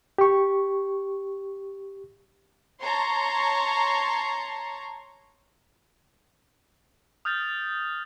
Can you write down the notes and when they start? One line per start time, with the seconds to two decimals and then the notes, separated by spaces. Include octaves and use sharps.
0.18 G4 C#6
2.82 C#5 A5 A#5 C6
7.25 D#6 F6 G6 A6 F7